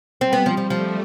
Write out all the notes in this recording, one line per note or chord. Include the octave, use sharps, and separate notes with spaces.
G3 C4
B3
F3
F3
F3 A3